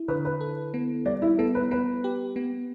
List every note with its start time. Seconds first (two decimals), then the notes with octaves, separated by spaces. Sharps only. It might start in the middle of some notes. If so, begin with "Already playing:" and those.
Already playing: E4
0.08 D3 B4
0.25 B4
0.41 A4
0.74 B3
1.06 G3 D5
1.22 E4
1.38 B3 A4
1.55 B4
1.71 B3 B4
2.04 G4
2.36 B3